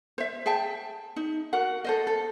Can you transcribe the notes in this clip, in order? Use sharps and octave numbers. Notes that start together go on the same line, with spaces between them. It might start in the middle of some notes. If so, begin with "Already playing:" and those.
C5 E5
G#4 E5 G5 A5
D#4
F#4 A#4 F#5
A4 C5 D#5
A4